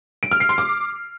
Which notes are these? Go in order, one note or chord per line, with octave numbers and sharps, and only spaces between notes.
D7
F6
C7
C6
D6